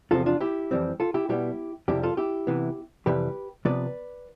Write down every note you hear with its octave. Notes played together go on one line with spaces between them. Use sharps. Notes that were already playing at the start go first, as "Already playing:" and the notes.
E2 C3 F3 C4 F4 A4
D4 F4
E4 G4
F2 E3 G3 C4
F4 A4
E4 G4
B2 G3 B3 E4 G4
F2 C3 G3 E4 G4
F4 A4
E4 G4
C3 E3 B3
F2 C3 E3 G3 G4 B4
C3 F3 B3 B4 D5